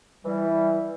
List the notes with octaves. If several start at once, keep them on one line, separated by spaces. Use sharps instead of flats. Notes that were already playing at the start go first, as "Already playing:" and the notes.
E3 G3